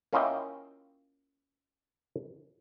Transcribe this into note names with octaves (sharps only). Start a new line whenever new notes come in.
A#3 C#4 E4 F4 D#5 G5